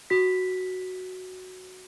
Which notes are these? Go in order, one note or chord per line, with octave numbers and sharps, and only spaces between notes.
F#4 B6